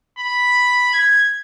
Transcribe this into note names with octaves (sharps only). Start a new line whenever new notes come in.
B5
G#6